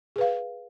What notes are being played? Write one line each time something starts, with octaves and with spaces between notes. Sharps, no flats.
G#4 B4 F5